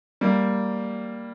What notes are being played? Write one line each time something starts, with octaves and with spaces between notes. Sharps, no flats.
G3 A#3